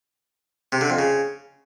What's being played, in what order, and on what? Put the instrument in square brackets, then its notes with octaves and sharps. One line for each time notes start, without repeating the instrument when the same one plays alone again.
[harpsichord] C3
D3
F2
C#3